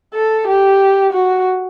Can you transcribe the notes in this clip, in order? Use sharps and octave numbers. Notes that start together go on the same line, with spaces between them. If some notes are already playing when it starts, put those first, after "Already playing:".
A4
G4
F#4